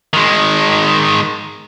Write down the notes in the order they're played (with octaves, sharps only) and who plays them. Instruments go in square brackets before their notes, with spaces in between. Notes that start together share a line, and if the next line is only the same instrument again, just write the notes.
[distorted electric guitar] D#3 G#3